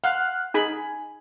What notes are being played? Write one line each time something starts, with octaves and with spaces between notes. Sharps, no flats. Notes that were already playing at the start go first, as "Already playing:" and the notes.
F5 F#5 F6 F#6
D#4 G#4 G#5 B5